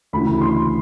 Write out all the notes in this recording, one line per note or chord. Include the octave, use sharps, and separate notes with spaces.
D2 C#3 E3 B5
B5
C6